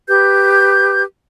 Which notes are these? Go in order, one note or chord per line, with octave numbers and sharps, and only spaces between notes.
G4 B4 G6